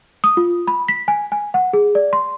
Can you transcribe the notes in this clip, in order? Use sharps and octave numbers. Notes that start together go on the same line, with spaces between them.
D#6
F4
B5
B6
G#5
G#5
F#5
G#4
D5
C6